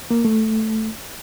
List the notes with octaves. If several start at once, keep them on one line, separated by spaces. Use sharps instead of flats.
A#3
A3